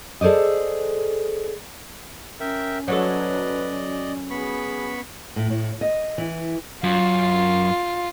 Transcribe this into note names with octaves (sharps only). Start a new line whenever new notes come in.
G#4 A4 C5 D5 D#5
C#4 A#4 E5 G5
F#3 A4 B4 D5 D#5
B3 G#4 B5 C#6
A2
A2
D#5
E3
F#2 F4